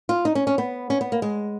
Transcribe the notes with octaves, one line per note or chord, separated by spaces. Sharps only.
F4
D#4
C#4
C#4
B3
C#4
B3
A#3
G#3